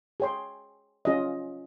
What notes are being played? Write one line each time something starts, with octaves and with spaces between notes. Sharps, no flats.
G#4 C#5 G5 C6
C#4 F4 G#4 D#5